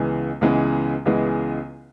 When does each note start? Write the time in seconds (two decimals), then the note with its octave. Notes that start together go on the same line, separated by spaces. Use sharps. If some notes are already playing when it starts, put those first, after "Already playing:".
Already playing: C#2 C#3 E3 G#3 B3
0.41 C#2 C#3 E3 G#3 B3
1.06 C#2 C#3 E3 G#3 B3